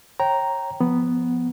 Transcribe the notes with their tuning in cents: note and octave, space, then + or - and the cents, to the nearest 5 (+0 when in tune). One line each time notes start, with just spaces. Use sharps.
C#5 -25 G5 -15 A#5 +0
F3 +0 B3 +0